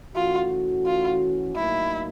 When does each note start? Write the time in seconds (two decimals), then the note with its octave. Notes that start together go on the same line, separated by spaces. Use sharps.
0.15 E3 A3 C#4 F4 F#4
0.86 F4
1.55 A2 F#3 A#3 D#4 E4